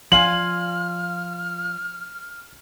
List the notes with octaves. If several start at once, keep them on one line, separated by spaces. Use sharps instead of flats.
F3 F4 D5 G#5 F6 F#7